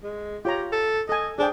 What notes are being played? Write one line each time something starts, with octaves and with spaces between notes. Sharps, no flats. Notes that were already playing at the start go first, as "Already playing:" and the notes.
G#3
F4 G4 C#5 A#5
A4
A4 D#5 G#5
D4 G#4 C5 G5